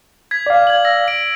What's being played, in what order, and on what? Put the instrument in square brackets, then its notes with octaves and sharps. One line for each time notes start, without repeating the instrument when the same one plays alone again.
[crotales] G#6 B6
[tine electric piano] D5 F5
[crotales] G#6 F#7
E6 A#6
A#6 D7